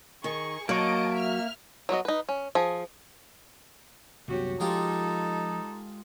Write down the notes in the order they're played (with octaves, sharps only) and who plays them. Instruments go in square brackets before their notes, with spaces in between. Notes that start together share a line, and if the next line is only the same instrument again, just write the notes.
[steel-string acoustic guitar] D#3 [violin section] G#4 C#6
[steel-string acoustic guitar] F#3 [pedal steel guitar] A#3 C#6 [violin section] D#5 A5 D7
[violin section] E5 F6
[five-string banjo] F#3 B3 F#4 D#5
D#4 B4
C#4
F3 G#4
[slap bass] C2 F#2 B3 [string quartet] F#4 G4 C#5
[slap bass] F3 [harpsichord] G#3 F4 G4 [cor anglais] D#4 [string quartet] A4